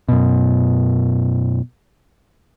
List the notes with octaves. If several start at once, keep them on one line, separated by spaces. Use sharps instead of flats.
F#2 B2